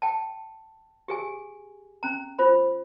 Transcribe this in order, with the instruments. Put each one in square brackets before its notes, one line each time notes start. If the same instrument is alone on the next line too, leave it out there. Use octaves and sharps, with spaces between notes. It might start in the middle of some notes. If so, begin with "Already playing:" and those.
[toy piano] G5 A5
G4 G#4 G#5
C#4 A#5
F4 C5 B5